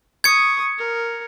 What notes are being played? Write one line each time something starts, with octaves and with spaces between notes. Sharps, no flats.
C#6 D#6 G#6 C#7
A#4